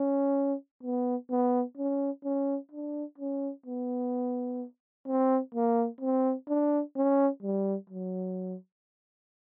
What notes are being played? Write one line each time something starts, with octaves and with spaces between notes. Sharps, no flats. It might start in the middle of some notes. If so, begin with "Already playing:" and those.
Already playing: C#4
B3
B3
C#4
C#4
D4
C#4
B3
C4
A#3
C4
D4
C#4
G3
F#3